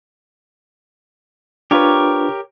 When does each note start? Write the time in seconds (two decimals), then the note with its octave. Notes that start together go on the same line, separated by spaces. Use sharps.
1.71 D4 F4 G4 A#4 B4 C#5